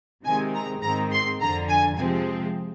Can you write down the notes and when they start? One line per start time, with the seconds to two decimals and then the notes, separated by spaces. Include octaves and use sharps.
0.25 C3 D#3 G#3 C4 G#5
0.54 A#5
0.82 G#2 D#3 G#3 C4 A#5
1.12 C6
1.41 F2 D3 F3 A#5
1.69 G#5
1.98 C3 F3 G#3 C4 G#5